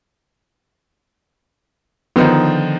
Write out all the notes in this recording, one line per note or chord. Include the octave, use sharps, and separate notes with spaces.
D3 D#3 F3 B3 D#4